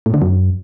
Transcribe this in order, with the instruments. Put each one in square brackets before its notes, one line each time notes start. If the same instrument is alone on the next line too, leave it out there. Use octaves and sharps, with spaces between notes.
[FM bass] A2
D3
F#2